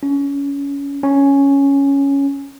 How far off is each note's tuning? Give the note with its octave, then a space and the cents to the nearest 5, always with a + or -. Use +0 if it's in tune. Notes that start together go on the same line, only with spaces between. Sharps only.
C#4 +25
C#4 +5